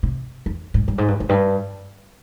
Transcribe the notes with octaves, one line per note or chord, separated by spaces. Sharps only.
C3
F2
G#2
G2
G#2
G2
F2
G2